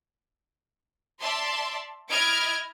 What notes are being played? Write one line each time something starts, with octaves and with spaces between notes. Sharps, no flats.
D5 E5 A5 C6
E4 D#5 F6 G#6 D7